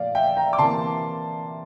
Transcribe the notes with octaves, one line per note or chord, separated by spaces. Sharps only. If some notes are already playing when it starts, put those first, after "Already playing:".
Already playing: A#2 F3 A3 D5 F5
E5 G5
G5 A#5
D6
C3 E3 A#3 A5 C6